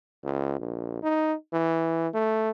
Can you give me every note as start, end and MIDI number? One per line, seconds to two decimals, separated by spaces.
0.24 0.59 37
0.59 1.01 34
1.03 1.34 63
1.53 2.08 52
2.14 2.50 57